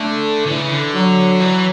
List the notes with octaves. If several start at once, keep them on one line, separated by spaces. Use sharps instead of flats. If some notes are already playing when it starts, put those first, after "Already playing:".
Already playing: D3 A3
D3 E3
C#3
D3
F#3
E3